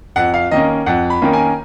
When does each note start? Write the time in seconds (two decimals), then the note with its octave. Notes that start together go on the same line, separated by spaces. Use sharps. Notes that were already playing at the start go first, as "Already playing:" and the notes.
0.16 F2 F#5
0.34 F5
0.51 D#3 A#3 C#4 D#5
0.86 F2 F#5
1.10 B5
1.22 D#3 A#3 C#4
1.33 G#5